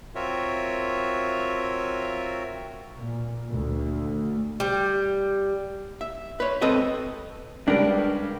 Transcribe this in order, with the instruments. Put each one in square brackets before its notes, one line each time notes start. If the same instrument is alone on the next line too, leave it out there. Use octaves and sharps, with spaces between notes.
[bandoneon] C4 F4 F#4 A#4 C#5 E5
[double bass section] A#2
D2
[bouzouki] G3
[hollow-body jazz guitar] E5
B4 C#5
C4 A4 B4 D#5 E5
[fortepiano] C#2 G3 B4 [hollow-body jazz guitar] D4 A#4 D5